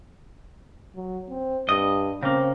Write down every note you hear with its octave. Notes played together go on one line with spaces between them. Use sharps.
F#3
C4
G2 D#5
C#3 A#3 C4